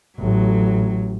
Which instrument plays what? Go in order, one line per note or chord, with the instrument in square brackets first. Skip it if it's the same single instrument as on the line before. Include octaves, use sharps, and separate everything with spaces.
[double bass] A1 [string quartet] F#3